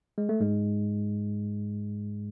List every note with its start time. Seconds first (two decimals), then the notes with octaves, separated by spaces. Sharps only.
0.18 G#3
0.29 A3
0.40 G#2 G#3